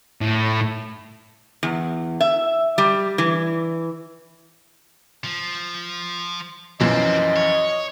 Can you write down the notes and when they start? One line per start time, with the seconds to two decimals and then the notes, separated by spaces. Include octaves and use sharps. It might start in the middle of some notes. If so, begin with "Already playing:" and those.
0.21 A2
1.63 E2
2.21 E5
2.78 G3
3.18 E3
5.25 F3
6.80 B1 F#2 E3 F3 C4 D#5
7.36 C#5